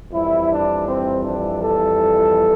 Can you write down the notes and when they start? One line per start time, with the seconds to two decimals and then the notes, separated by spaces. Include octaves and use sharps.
0.11 F2 E3 G3 E4
0.49 D4
0.85 C4
1.22 D4
1.60 A4